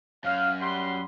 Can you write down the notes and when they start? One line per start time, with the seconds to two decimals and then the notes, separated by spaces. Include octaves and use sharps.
0.24 F#2 F5
0.60 G3 F#5 C6